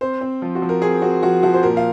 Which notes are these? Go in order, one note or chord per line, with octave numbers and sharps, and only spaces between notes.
C4 C5
C4
F3 F4
F#4
F3
A#4
C4 G#4
C4 F#4
F3 F#4
F3 F#4
C5
A#2 A#4
F5